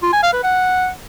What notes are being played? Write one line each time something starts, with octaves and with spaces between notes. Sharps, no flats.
F4
G#5
F5
B4
F#5